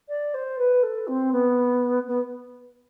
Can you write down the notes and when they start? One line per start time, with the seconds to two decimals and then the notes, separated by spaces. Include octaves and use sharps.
0.08 D5
0.34 C5
0.58 B4
0.83 A4
1.07 C4
1.32 B3
2.07 B3